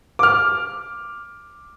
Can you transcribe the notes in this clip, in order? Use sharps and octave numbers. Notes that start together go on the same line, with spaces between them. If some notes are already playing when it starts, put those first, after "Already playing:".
D6 F6